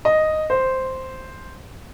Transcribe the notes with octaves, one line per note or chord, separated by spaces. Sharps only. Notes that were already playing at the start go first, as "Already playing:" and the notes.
D#5
C5